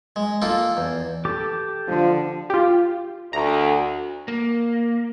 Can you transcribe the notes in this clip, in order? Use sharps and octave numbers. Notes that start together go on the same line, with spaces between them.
G#3
A#3 D#4 F4 A4 A#4
E2
G4 A4 D6
D3 F3
F4 G4
D2 A#5
A#3